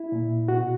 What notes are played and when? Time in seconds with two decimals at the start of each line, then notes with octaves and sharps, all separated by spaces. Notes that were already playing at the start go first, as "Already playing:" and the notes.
Already playing: E4
0.12 A#2
0.48 B2 F#4